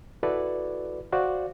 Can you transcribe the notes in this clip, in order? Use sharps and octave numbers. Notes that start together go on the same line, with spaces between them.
E4 F#4 A4 B4 D5
F#4 C5 D5 F5